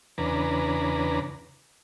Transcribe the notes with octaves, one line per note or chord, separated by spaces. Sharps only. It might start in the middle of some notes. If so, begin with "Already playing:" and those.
E2 C#3 D4 B4 A#5